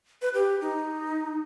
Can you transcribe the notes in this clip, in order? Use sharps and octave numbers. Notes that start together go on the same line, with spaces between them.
B4
G4
D#4